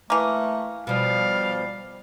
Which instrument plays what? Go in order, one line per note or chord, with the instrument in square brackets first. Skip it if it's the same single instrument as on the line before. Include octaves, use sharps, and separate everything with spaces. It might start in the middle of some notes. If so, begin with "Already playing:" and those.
[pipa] E3 A#3 [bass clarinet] A3
[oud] B2 F3 [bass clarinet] G3 [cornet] F5